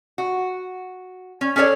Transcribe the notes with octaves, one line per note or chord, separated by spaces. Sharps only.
F#4
C#4
C#4 G#4 A4 C#5 D5